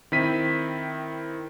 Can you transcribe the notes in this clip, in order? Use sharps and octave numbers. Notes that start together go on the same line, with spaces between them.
D#3 C4 E4 B6 D#7